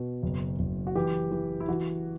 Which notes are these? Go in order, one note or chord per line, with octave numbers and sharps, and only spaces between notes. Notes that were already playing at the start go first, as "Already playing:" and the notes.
Already playing: B2
F#1
F#1
F#4
E3 G4
E3
E4
E3 F#4